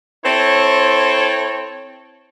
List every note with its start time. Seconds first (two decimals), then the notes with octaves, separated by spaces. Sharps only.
0.25 C4 E4 A4 C5 C#5